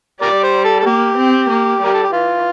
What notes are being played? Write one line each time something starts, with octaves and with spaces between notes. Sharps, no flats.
G3 G4 A#4 D5
C5
A4
A4
A#3 G4
C4
A#3
G3 A#4
A4
G4
E3 F4